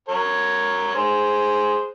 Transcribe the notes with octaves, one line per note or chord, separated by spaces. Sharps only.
A#4 C#5
G#4 C5